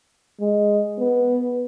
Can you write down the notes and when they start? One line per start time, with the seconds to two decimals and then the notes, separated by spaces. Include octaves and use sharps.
0.40 G#3
0.98 B3